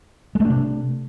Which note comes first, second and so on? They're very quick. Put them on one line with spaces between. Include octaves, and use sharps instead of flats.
G#3 A3 D4 C3